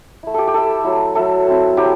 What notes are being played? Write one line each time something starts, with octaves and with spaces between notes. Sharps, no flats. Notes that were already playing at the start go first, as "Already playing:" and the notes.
A3 E4
G4 A4
G4
A3 E4 A4
F#3 A3 E4
F#3 A3 E4 A4
F#3 C4 E4
F#3 C4 E4 G4